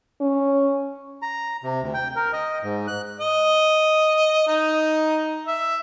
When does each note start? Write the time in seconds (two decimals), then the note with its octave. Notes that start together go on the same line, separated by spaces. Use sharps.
0.21 C#4
1.22 A#5
1.64 C3
1.82 D2
1.94 G5
2.16 A#4
2.33 D#5
2.63 G#2
2.88 F#6
3.19 D#5
4.47 D#4
5.47 E5